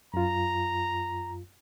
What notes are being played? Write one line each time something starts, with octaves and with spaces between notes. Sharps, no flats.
F#2 F4 A#5